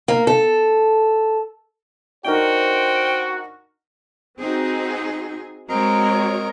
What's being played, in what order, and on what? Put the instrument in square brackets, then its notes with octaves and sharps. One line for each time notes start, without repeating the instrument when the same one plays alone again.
[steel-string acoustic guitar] A#3
A4
[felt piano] D4 D#4 A#4 [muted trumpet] F#4 [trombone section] C5 [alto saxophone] G5
[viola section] C4 D#4 F#4 [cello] G#4
[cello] G#3 C4 [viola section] F#4 C#5 [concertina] A#4 D#5 A#5